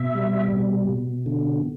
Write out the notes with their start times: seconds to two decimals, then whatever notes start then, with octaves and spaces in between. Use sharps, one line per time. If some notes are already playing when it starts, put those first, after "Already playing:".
Already playing: B2 E5
0.15 G3
0.53 B2
0.89 B2
1.26 D3